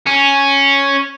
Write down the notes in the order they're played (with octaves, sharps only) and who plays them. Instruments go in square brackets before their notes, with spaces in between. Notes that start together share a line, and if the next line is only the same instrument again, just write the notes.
[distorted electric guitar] C#4